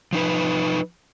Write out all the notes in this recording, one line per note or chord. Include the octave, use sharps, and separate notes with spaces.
F3 D#4 B4